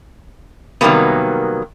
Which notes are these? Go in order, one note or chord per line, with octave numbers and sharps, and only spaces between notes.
C3 D#3 F#3 G3 A#3 B3